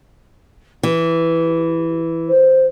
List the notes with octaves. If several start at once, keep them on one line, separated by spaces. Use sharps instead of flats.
E3 G4
C5